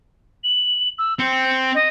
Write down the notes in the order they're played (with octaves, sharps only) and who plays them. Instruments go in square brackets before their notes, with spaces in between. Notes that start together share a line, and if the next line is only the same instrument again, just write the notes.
[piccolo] F#7
E6
[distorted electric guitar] C4 [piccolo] C#7
[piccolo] D#5